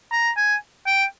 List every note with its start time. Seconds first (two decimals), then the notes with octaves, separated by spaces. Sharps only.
0.12 A#5
0.37 G#5
0.86 G5